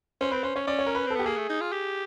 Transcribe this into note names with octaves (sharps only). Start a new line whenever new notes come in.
C#4 C5
C4 B4
C#4 C5
C#4 C#5
C#4 D5
C#5
A#4
B4
C4 A4
B3 G4
A#3 G#4
A3
D#4
F4
G4